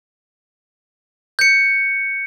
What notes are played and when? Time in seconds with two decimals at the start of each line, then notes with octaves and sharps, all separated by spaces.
1.39 G6 C#7